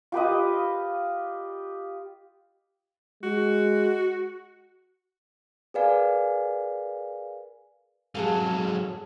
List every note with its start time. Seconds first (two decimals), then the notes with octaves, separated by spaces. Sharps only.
0.12 F4 G4 B4 D#5
3.23 G#3 F#4
5.74 G#4 A#4 B4 D5 F5 G#5
8.15 G#2 F#3 G#4 A4 F5